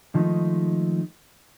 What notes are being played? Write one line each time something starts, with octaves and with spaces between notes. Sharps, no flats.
D#3 F3 G#3 A3 D#4